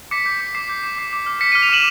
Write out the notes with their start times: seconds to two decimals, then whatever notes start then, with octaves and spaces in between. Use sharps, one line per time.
0.11 D6 B6 C#7
0.26 G6
0.41 D6
0.55 D6 C7
0.69 G6
0.83 D6
0.98 D6 C7
1.13 D6
1.26 F6
1.41 D6 B6 C#7
1.52 F6 C#7 D#7
1.62 D#7 F7
1.69 D6 E7 F#7